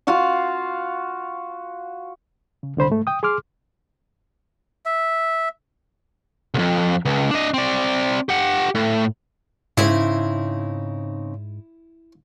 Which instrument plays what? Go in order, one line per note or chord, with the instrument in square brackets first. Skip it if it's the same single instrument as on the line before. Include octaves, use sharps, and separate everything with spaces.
[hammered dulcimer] F4 F#4 F5 F#5
[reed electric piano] C#3
C2 D3 C5 B5
G#2 A3
G5 D#6
G#4 C6 D6 F6
[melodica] E5
[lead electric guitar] C2 F2
C#2
D4 D#5
C4 D5
G4 F#5
A2
[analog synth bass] G#2 [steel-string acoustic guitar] C#3 C4 D#4 [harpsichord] E4